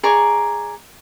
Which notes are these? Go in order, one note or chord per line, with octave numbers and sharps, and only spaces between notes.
G#4 D5 A#5 C#6